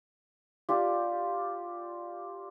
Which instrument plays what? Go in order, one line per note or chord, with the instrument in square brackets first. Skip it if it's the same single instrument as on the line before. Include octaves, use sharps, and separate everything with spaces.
[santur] D4 F4 G4